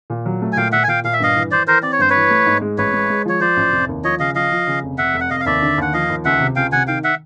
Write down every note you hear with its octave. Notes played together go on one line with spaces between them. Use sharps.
A#2
F#3
A3
G#5
A#2 F5 G5
A#2 E5 F#5
G#5
A#2 F5 G5
A#2 F5
E5
G2 D#5 F5
E3
E3 C5 D5
E3 A#4 C5
C4 D5
C#5
G2 C5
B4 C#5
E3
A3
G#2
G#3
A1 B4 C#5
G#3
G#3
F3 C#5
F3 C5 D5
A1
F1
D#2
F3 C#5 D#5
C#3 D#5 F5
F3 D#5 F5
F3
C#3
F1
F1 E5 F#5
F1
F#5
F1 D#5 F5
F5
D#2 D5 E5
D3
D#2 F#5
F3 D#5 F5
D#2
C#2 E5 F#5
C3
C#2 F5 G5
C3 F#5 G#5
D#3 F5 G5
E5 F#5